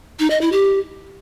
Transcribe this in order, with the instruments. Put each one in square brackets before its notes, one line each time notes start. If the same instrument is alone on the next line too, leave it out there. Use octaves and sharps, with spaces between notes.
[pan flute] D#4
D#5
E4
G4